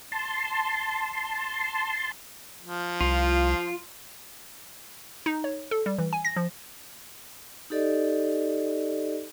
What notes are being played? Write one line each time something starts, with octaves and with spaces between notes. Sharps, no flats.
A5 C6
F3
C2 F4
D#4
C#5
A4
G3
E3
G#5
A#6
F3
D#4 G4 A4 D5 D#5